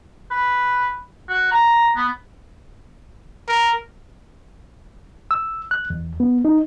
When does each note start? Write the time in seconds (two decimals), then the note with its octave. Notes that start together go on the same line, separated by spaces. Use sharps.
0.31 B4
1.29 F#4
1.52 A#5
1.96 B3
3.48 A#4
5.31 E6
5.71 F#6
5.90 E2
6.20 B3
6.45 D#4